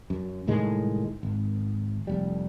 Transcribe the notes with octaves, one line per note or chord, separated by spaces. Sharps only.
F#2
C2 A2 D#3 G#3
G#1
F1 G3